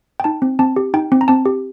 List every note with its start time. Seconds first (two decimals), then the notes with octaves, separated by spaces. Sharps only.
0.20 G5
0.24 D#4 A5
0.42 C4
0.59 C4 A5
0.76 G4
0.94 D#4 G5
1.12 C4
1.21 A#5
1.28 C4 A5
1.46 G4